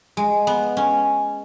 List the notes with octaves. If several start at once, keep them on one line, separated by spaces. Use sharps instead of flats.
G#3
B3
C#4